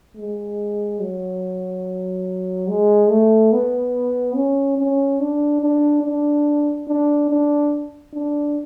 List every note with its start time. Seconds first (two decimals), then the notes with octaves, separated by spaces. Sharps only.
0.17 G#3
1.00 F#3
2.68 G#3
3.10 A3
3.52 B3
4.35 C#4
4.78 C#4
5.20 D4
5.61 D4
6.03 D4
6.88 D4
7.29 D4
8.13 D4